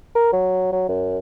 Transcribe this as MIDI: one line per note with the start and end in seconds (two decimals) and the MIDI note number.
0.15 0.32 70
0.33 0.70 54
0.72 0.85 54
0.89 1.18 42